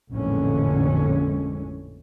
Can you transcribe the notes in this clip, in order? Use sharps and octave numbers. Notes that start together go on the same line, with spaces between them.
A1 F2 A#2 D3 G#3 C#4